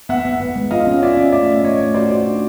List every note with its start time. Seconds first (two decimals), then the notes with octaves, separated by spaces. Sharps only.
0.09 B3 E5 F#5
0.25 B3
0.40 B3
0.56 G#3
0.71 F4 D#5 F5
0.87 C#4
1.02 F4 D5 E5
1.17 C#4
1.32 A3 D5 E5
1.48 C#4
1.64 C#4 C#5 D#5
1.79 A3
1.94 F#4 C5 D5
2.10 F#4
2.26 D4